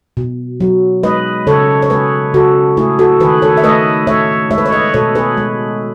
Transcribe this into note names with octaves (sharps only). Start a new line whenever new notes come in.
B2
F#3
G#3 B4 D#5
C#3 A4 C#5
C#5
G#3 G#4 B4
C#3 F#4 A4
A3 E4 G#4
F#4 A4
D#3 G#4 B4
A4 C#5
E5
A3 B4 D#5
A3 C#5 E5
G#3 C#5 E5
B4
C#5
B4 D#5
B2 A4 C#5
G#4 B4
G#3